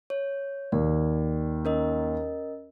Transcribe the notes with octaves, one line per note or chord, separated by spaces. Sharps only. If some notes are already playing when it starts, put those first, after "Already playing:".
C#5
D#2 D5
C#4 A#4 D#5